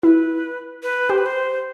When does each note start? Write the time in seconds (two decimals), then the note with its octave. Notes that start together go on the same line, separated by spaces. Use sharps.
0.03 E4 B4
0.83 B4
1.10 G4 C5
1.18 B4
1.26 C5